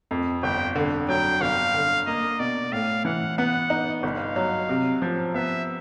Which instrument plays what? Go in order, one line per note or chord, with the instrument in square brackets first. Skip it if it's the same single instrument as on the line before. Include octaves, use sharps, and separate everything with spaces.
[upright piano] F2
[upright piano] G1 [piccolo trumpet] G5
[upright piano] D3
[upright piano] F#3 [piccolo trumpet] G5
[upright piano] G1 [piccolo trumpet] F5
[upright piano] D3
[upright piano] A#3 [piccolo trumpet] D#5
[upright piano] B2 [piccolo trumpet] D5
[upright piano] A2 [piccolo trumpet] F5
[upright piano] E3 [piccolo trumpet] F#5
[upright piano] B3 [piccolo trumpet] F#5
[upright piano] D#4
[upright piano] G1 [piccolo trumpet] F5
[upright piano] F#3
C3
F3
[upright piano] B3 [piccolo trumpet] E5